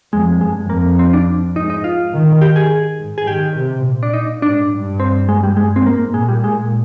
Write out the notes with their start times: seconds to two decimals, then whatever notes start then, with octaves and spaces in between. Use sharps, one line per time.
0.13 F2 G#3
0.41 G2 G#3
0.70 F2 A#3
0.99 C4
1.13 D4
1.56 G#2 D#4
1.70 D#4
1.84 F4
2.14 D#3
2.41 G4
2.56 G#4
3.00 G#2
3.18 G#4
3.27 D#3 G4
3.57 C3
3.85 A#2
4.03 D4
4.13 D#4
4.42 G#2 D4
4.72 G2
5.00 C4
5.29 G#3
5.43 G3
5.57 G2 G#3
5.76 C4
5.86 G#2 A#3
6.14 A#2 G#3
6.29 G3
6.44 G#3